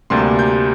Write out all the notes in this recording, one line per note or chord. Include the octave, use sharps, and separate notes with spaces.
D2 C3 G3 A#3 C6
G6